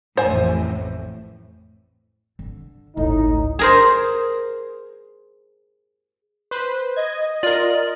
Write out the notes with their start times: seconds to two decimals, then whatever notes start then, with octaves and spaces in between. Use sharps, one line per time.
0.17 A1 F2 A2 C5 G#5
2.39 D3
2.97 G#1 C#2 A2 D#4
3.59 G#4 A#4 C5
6.51 B4 C5
6.96 D#5 G#6
7.43 F4 A#4 D5